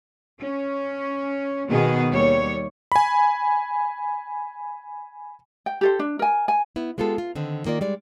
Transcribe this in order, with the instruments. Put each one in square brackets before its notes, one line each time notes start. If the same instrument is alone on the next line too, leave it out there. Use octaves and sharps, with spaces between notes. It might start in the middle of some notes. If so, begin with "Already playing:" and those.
[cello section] C#4
B2 D#3 B3 G#4
D#2 G3 C#5
[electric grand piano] G#5 B5
[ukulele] G5
G4 A4 C5
D4
A#4 G#5
G#5
[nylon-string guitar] B3 E4
G#3 B3 F4 G4 A4
F4
D3 D#3 C4
D#3 A#3 F4 D5
G3 G#3 D5